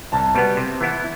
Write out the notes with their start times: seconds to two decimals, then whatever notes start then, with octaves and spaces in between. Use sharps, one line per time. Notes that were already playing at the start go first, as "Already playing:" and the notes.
0.12 C2 A5
0.35 B2 G3 B3
0.57 C3
0.81 E3 B3 E4